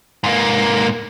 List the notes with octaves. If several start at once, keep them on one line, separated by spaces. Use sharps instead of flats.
G#2 A#3